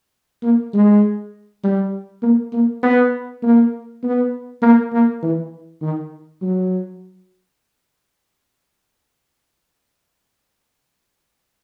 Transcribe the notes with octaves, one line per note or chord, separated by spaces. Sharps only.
A#3
G#3
G3
A#3
A#3
B3
A#3
B3
A#3
A#3
E3
D#3
F#3